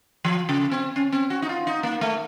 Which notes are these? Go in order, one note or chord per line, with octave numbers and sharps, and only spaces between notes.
F3
C#3
C4
C#4
C4
F#4
D#4
F4
D#4
A#3
A3